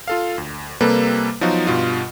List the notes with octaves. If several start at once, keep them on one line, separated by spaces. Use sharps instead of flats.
F4 A4 F5
D2
C3 G3 A#3 A4 B4
F3 F#3 B3 D#4 F4 F#4
G2 B2 F4